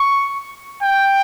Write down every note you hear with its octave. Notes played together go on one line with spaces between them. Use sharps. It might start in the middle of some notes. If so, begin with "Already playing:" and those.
Already playing: C#6
G5